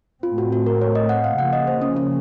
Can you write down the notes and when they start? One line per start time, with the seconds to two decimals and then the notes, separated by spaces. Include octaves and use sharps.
0.23 A2 A3 C4 F4
0.38 F#4
0.52 F#4
0.67 A#4
0.81 C#5
0.95 D#5
1.09 F#5
1.24 F5
1.38 C#3 F3 A#3 F#5
1.53 D#5
1.67 C5
1.82 C#4
1.96 C#4